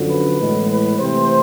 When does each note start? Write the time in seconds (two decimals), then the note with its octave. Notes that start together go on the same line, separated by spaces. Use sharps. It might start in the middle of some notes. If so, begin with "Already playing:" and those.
Already playing: F#2 D3 F3
0.09 B4
0.39 A2 E3 G#3 B3
0.70 B4
0.99 C3 E3 A3 C4 C5